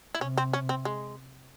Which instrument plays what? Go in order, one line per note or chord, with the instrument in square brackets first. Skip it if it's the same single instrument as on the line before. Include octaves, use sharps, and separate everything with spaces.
[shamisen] E4
[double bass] C3 [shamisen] C#4
[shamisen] C4
C#4
C4
G#3